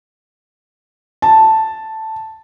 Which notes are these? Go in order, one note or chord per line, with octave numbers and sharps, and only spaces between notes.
A5